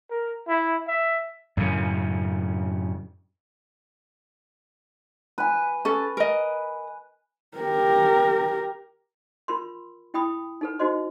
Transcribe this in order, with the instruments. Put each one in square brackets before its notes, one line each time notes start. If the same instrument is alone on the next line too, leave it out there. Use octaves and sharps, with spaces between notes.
[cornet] A#4
E4
E5
[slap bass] F#2 A2 C#3
[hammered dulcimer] B4 G#5
[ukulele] C#4 A4
A#4 D#5
[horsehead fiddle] G4 A#4
[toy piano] F4 A#4 B5 C6
E4 G5 B5 D#6
D#4 A4 B4
D#4 F#4 C5 D#5 C6